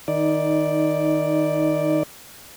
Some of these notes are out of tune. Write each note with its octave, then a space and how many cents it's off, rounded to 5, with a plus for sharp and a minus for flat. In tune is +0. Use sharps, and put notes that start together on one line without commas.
D#3 +0 D#4 +20 D5 +0